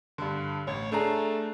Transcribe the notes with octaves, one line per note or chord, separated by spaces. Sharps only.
G2 D3
A1 C#5
A3 D4 G#4 A#5